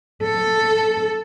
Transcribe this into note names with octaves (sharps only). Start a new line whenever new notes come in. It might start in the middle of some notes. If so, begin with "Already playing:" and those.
A4